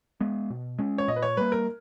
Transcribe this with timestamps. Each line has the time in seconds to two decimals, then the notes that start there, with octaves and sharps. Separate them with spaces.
0.21 G#3 B3
0.50 B2
0.78 G#3 C#4
0.98 C#5
1.08 A#2 D#5
1.16 B4
1.22 C#5
1.37 G3 A#3 B4
1.52 A#4